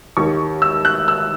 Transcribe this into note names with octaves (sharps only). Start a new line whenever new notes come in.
D#2 D#3 C#6
E6
F#6
E6